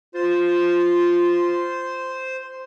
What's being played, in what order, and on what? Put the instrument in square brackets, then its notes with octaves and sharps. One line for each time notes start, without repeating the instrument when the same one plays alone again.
[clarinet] F4 [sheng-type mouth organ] C5